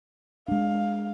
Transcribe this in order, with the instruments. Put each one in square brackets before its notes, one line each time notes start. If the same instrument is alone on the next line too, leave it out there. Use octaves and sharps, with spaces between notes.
[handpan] G#3 D4 [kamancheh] F5